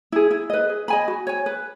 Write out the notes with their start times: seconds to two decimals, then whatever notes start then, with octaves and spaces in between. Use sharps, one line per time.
0.12 E4 G#4
0.31 E4
0.50 B4 D#5
0.69 G#4
0.88 D#5 G#5 B5
1.08 F#4
1.27 C#5 G#5
1.46 B4